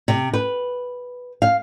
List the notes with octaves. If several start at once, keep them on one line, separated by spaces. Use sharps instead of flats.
C3
B4
F5